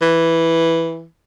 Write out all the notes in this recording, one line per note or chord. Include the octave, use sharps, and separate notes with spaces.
E3